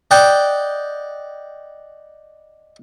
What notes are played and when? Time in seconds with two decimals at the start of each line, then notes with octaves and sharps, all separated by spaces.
0.11 D5 D#5 F#5 G5